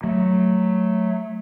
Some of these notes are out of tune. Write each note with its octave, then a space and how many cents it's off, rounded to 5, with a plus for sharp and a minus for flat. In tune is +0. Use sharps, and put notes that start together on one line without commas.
F#3 +0 A3 +0